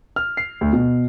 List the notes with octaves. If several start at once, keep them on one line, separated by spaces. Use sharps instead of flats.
F6
C7
D2
B2